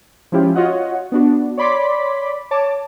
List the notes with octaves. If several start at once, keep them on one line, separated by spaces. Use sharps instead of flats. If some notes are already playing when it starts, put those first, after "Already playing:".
F3 G#3 C#4 E4 F4 G4
F4 F#4 C#5 D#5 F#5
B3 D4 F#4
C#5 D5 B5 C6 D6 B6
C#5 A5 D6